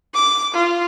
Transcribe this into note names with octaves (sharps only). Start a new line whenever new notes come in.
D6
F4